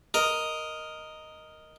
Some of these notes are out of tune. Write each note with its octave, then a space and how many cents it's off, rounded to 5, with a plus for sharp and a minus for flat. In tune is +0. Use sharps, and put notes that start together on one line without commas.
A#4 +0 D#5 +0